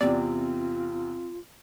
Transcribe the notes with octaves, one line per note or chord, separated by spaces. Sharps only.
E2 C3 C4 F4 D5